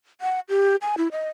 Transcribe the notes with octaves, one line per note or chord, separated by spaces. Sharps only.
F#5
G4
G#5
E4
D#5